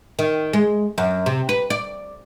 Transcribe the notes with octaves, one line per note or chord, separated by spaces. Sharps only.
D#3
G#3
F#2
C3
B4
D5